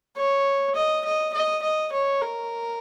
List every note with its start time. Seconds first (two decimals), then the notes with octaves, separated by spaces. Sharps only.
0.17 C#5
0.75 D#5
1.05 D#5
1.33 D#5
1.62 D#5
1.92 C#5
2.21 A#4